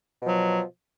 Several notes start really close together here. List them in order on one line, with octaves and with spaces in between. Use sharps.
B2 F3 F#3